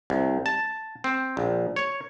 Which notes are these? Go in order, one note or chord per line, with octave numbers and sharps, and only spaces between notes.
C2
A5
C4
A#1
C#5